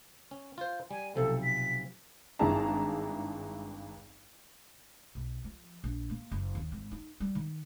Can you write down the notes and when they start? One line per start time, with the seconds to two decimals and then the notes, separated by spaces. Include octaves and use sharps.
0.31 C#4
0.58 F4 C5
0.91 G3 G#5
1.16 B1 C3 F3 A4
1.44 B6
2.39 G#1 G2 E4 G#4 A5 A#5
5.15 B1
5.44 F3
5.84 A#1
6.10 A#3
6.31 F#1
6.55 D#2
6.72 G#1
6.91 D#4
7.20 G3
7.35 D#3